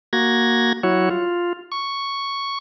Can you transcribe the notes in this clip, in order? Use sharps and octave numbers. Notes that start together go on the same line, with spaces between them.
A#3 F#4 G#6 A#6
F#3 E4 F#4 C#5
F4
C#6